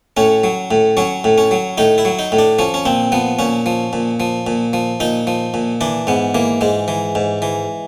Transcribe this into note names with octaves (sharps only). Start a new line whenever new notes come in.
A2 C#4
F#3
A2
F#3 C#4
A2
C#4
F#3
A2 D#4
E4
F#3
D#4
A2
D4
F3 C#4
C#4
A#2 C4
F3 B3
A#2 C#4
F3
A#2
F3
A#2
F3
A#2 D#4
F3
A#2
E3 D4
G#2 B3
E3 A#3
G#2 G#3
E3
G#2
E3